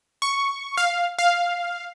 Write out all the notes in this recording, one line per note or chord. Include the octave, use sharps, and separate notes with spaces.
C#6
F5
F5